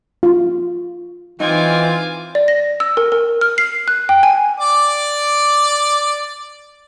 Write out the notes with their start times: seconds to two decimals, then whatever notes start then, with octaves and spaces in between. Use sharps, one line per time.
0.23 F4
1.40 E3 C4 D#4 F4 G#5 D6
2.35 D5
2.48 A#6
2.80 E6
2.97 A#4
3.12 A#4
3.41 F6
3.58 C7
3.88 F#6
4.09 G5
4.23 G#5
4.60 D5 D6